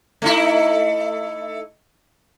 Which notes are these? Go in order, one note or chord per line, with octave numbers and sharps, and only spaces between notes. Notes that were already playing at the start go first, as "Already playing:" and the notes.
A3 D#4 E4